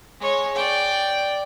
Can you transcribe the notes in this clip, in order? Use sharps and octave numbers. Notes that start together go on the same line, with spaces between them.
G#3 C#5
D5 G5